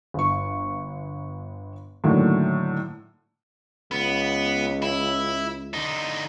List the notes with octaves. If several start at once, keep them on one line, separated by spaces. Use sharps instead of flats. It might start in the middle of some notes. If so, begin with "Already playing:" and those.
G1 C#6
A2 D3 D#3 F#3 A#3
C#2 B3
E4
D3 D#4